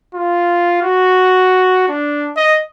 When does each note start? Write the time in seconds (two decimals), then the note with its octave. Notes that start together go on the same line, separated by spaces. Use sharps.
0.15 F4
0.82 F#4
1.89 D4
2.37 D#5